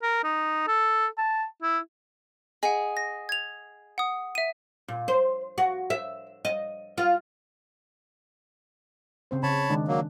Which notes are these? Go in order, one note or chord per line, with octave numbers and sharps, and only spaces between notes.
A#4
D#4
A4
A5
E4
G#4 D#5 F#5
A#6
G#6 F7
F#5 D#6
E5 D#7
A#2
C5
F#4
E5
D#5
F4
C#3 C4 C5
C#3 C#5 A5 B5
D#3 G#3 D4
F#3 A#3